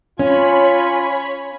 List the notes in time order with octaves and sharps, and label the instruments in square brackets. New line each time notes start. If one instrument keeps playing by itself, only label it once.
[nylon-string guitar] C#4 [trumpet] F4 [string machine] C#5 B5 [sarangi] G#5